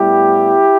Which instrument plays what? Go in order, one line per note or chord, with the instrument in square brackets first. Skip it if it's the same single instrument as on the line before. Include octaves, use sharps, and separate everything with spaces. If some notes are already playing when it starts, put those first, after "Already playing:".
Already playing: [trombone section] A2 G3 B3 E4 G4